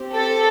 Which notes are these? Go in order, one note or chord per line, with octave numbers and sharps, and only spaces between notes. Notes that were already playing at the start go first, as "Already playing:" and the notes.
Already playing: C4 G4
A4